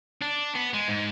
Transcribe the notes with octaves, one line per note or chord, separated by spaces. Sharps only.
D4
B3
G#3
G#2